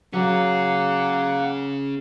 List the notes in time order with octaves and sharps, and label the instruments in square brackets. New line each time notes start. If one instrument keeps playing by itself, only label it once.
[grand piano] F#3 [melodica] A#3 F#5 [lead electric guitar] C#4 G#4